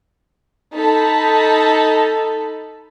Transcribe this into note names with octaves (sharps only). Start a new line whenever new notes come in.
D#4 A4 A5 B5